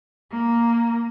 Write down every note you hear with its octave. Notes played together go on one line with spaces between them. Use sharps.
A#3